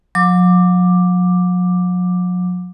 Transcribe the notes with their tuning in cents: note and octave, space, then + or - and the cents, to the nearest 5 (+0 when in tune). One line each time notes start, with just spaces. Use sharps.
F#3 -45 D6 +5